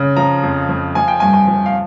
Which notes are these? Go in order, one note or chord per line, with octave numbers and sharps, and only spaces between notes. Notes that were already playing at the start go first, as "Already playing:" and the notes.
Already playing: C#3
F3 A#5
F2
F2
F3 G#5
G5
G2 G#5
G#5
F3
F5